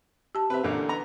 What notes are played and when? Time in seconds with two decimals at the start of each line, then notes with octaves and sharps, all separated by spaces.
0.35 G4 A5
0.50 C3 B4 E5
0.64 A1 A#2 D3 F5
0.89 B3 A#5